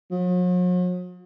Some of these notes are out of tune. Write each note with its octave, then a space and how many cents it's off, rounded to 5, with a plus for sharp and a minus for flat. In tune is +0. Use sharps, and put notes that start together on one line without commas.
F#3 -45